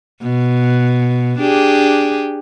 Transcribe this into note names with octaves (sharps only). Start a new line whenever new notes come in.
B2
D4 G4 G#4